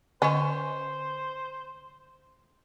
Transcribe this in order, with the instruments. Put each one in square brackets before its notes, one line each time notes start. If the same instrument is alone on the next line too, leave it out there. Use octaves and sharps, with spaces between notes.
[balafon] D3 D#5 G#5 [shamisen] C#4 [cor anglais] C5